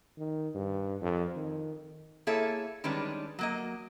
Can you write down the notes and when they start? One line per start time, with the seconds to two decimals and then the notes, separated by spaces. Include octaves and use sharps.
0.18 D#3
0.54 G2
1.01 F2
1.36 D#3
2.27 A#3 E4 G#4 A4 C#5 E5
2.84 D#3 G3 G#3 C#4 D4 B4
3.39 F#3 A#3 D#5